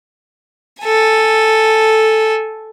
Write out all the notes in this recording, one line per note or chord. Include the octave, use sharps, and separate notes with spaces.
A4 G#5